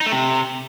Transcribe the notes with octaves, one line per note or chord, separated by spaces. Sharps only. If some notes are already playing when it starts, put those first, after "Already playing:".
D#4
A3
C3